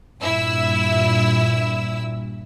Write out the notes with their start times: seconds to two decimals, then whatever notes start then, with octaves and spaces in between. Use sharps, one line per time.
0.21 G2 A#2 E4 E6